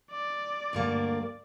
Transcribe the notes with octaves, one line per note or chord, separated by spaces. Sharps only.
D5
D2 G2 A#3